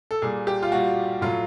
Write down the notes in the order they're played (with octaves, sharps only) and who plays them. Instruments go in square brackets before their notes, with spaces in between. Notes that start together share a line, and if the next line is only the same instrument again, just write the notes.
[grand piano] A4
A#2 G3 G#4
G4
F4
G3 F#4
A#2
A2 F#3 F4